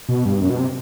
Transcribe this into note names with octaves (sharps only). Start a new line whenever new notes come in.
B2
G2
F#2
B2
C3